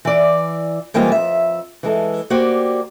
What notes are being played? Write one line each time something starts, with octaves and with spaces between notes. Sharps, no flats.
E3 D5
E3 G3 G#3 A#3 C4 F4
F2 E5
E3 G#3 A4
A#3 F#4 G4 C5 D5